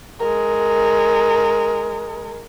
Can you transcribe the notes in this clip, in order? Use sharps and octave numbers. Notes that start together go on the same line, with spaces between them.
G#3 A#4